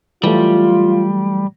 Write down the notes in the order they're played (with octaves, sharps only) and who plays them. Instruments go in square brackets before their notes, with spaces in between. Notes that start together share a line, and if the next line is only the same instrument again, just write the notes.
[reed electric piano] E3 F#3 A3 [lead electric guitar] G3 [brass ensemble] F4